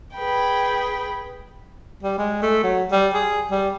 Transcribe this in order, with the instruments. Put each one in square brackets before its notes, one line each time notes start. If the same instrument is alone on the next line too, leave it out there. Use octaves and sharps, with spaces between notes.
[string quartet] G#4 B4 G5
[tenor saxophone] G3
G#3
A3
F#3
G3
G#4
G3